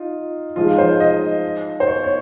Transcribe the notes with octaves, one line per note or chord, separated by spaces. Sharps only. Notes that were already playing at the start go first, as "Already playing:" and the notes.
Already playing: D#4 F4
F3 G#3 D#4 F4
C5
D#5
C5
C#5
C#5